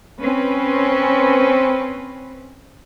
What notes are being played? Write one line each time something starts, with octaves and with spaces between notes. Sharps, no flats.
C4 C#4 B4